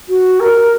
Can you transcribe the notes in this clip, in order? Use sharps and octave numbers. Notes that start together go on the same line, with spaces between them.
F#4
A#4